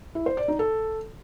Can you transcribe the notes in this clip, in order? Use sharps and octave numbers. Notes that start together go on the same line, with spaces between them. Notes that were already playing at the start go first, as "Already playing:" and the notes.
E4
C5
D5
D#4
A4